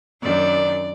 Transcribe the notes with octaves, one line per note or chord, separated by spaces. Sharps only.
F#2 D#3 D4 D5